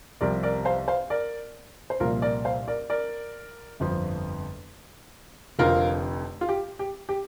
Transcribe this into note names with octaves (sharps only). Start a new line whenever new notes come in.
C2 C3 F3 A#4 D5
A#4 D5
C5 F5
C5 F5
A#4 D5
C5
C2 A#2 F3 F4 A#4
A#4 D5
C5 F5
A#4 D5
A#4 D5
G1 F2 F3
F1 F2 D3 F3 F4 A#4
F4
G4
G4
G4